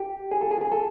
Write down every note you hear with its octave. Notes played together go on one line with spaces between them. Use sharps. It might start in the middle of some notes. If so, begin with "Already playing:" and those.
Already playing: G4
G#4
A4
G#4
G#4
A4